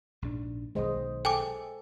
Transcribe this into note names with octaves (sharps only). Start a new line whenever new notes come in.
A#1 G#2 D4
B1 D#3 G#3 C5 D#5
A4 G5 G#5 D6